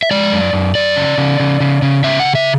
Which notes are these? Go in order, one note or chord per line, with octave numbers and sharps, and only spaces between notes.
E5
G#3 D5
F#2
F#2
F#2 D5
C#3
C#3
C#3
C#3
C#3
C#3 E5
F#5
C#3
E5